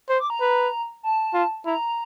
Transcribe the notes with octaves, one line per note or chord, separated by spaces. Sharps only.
C5
D6
A#5
B4
A5
F4
E4 A#5